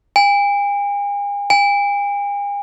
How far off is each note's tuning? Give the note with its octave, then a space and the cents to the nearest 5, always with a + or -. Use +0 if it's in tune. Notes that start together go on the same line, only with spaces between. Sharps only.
G#5 -45
G#5 -45